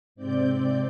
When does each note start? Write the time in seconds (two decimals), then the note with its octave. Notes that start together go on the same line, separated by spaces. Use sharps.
0.15 G#2 C3 C4 D5 G6